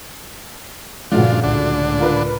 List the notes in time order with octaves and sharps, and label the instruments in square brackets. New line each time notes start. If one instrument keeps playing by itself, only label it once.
[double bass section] G2 A#2 C#3 [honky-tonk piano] F3 A3 F#4 [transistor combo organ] D4 F4
[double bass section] C#2 A2 [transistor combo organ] D3 D4
[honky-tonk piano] F4 A#4 B4